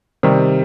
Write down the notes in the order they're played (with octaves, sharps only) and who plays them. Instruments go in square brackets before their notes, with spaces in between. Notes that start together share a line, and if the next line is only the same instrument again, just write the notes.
[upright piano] C3 D#3 G3